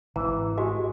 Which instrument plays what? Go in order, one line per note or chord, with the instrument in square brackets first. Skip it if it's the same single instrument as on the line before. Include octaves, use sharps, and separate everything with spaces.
[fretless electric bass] G#1 [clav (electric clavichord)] E3 [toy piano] A#5
[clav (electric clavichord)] G#3 [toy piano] F#4 G4